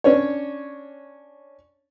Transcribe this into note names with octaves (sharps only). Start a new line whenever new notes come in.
C#4 D4 C#5